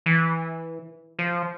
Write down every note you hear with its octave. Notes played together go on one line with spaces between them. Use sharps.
E3
F3